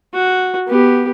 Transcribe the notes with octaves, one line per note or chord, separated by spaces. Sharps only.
F#4
B3 G4